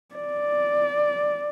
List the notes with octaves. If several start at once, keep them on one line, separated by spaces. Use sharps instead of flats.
D5